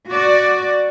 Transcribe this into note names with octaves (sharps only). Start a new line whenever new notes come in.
F#4 D5